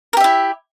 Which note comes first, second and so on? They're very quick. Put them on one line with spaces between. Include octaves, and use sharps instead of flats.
A#4 G4 E5 E4